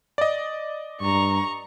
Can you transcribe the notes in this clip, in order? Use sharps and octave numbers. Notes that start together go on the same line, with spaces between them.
D5 D#5
G2 A#5 C#6